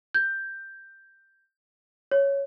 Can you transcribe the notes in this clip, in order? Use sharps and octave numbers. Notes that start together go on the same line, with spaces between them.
G6
C#5